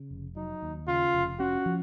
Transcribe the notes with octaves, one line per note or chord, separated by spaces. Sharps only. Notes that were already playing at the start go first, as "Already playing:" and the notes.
Already playing: C#3
F1
F#3 D#4
D#2
C#3 F4
F1
C#4 F#4
F3